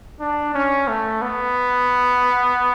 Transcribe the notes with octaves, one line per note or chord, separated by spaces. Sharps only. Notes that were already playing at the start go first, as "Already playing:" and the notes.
D4
C#4
A3
B3